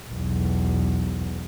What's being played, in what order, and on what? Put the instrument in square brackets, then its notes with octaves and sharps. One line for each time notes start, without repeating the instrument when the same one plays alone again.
[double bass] B1 E2